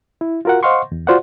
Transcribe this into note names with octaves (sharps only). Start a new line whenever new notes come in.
E4
F4 F#4 A#4 F5 F#5
C5 D#5 F5 F#5 C6 C#6
E2
F4 F#4 C5 D5 F5 F#5